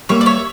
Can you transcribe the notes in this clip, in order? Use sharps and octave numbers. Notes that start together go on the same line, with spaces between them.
G3 A#3 C#5 E5
D5
C#5 E5